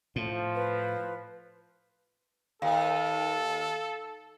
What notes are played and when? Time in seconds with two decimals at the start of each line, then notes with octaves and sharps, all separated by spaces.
0.16 A2 F3
0.55 B4
2.62 D#2 A4 F5